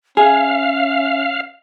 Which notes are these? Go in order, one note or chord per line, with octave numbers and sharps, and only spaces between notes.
C#4 G#4 E5 F5